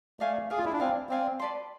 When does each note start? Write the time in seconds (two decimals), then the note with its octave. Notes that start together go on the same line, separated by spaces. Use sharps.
0.20 A3 D5 F5 G#5
0.50 G#4 D5 F5 G#5
0.58 F4
0.65 E4
0.73 D4
0.80 C4 D5 F5 G#5
1.09 C4 D5 F5 G#5
1.39 B4 D5 A5 C6